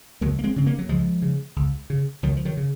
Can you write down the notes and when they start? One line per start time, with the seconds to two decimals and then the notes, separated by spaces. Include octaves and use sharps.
0.21 C#2 F#3 A#3
0.39 A#3
0.44 G#3 C4
0.56 C#3 C4
0.66 A#3 C#4
0.78 F#3
0.89 C#2 F3 G#3
1.22 C#3
1.56 C#2
1.90 C#3
2.23 C#2 D#3 F#3
2.37 F3
2.45 D#3 F#3
2.57 C#3